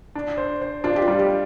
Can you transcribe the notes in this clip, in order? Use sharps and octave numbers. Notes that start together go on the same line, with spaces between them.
D4
C5
C5
D4 F4
G4
F4
G3
G4